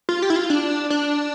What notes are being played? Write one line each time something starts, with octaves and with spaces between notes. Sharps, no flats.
F4
G4
E4
F4
D4
D4